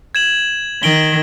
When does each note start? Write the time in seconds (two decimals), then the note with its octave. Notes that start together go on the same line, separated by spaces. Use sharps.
0.15 G#6 E7 F#7
0.83 D#3 D7 F#7 G7